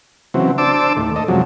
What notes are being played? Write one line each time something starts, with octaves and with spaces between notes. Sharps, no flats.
C#3 E3 F#3 C4
D4 C5 A5 D6 E6
D#2 A2
A4 D#5
F#2 C3 F3 F#3 G#3